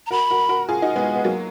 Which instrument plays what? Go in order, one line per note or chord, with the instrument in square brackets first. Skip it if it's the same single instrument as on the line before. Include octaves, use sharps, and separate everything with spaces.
[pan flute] A#5
[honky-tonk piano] F#4 A#4 [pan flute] B5
[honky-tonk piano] F#4 A#4
F#4 A#4
F4 G#4
D#4 F#4
G#3 B3
B3
F#3 A#3